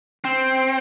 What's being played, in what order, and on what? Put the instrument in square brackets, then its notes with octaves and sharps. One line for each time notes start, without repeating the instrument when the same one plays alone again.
[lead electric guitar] C4